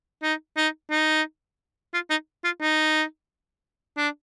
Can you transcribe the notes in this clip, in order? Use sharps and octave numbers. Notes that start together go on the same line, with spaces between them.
D#4
D#4
D#4
F4
D#4
F4
D#4
D4